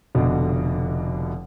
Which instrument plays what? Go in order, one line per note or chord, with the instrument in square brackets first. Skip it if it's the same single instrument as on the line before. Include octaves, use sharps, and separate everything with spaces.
[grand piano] F1 B2 D3